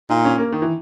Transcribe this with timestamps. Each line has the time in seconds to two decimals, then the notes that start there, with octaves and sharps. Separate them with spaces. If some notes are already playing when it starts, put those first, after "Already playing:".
0.10 A#2 D#4
0.25 C#4
0.38 A#3
0.52 D#3
0.62 E3